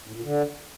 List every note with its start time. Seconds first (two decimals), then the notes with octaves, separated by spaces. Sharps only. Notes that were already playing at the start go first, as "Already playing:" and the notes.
0.07 A2
0.15 A#2
0.23 D3